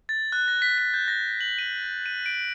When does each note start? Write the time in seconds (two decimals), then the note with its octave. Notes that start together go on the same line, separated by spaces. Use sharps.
0.09 A6
0.32 F#6
0.48 A#6
0.62 B6
0.78 B6
0.94 G6
1.08 A#6
1.41 F#7
1.58 D#7
2.06 D#7
2.26 D7